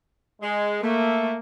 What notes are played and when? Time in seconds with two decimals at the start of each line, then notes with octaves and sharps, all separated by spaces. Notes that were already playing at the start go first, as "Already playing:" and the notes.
0.41 G#3
0.83 A3 A#3